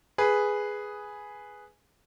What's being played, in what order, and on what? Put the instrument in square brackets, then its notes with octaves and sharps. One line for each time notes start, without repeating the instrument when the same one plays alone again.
[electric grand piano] G#4 B4